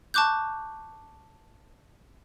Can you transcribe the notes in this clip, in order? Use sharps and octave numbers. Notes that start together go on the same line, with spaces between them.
A5 C#6 D6 F#6 G6